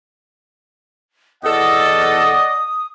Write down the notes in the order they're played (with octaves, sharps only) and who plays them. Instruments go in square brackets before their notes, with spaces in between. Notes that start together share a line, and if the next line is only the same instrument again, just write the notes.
[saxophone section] E2 A4 [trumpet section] D5 D#5 F#5 [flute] D#6